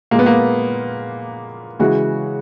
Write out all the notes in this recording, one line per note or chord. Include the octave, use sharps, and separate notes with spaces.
A#2 G#3 A#3
B3
A#3
C#3 E3 G#3 F#4